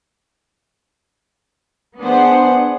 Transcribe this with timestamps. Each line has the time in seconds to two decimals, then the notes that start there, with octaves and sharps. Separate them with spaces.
2.01 B3 D4 G#4 C5 F#5